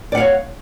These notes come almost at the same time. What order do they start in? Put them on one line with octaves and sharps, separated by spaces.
D5 F#5 F5 C#5